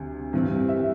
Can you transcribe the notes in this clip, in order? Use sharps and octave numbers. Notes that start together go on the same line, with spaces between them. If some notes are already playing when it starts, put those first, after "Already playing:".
Already playing: D2 C3 G3
G2 E3 G3 C4
E5